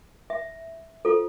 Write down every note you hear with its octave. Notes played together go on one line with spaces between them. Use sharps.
E5
F4 A4 C5